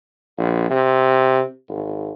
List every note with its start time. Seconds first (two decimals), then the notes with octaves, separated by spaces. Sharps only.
0.38 A#1
0.70 C3
1.69 G#1